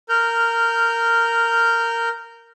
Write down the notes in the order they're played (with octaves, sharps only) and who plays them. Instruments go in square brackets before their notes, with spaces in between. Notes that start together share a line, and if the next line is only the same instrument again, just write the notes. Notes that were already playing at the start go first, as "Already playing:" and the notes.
[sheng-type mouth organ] A#4 F6 G6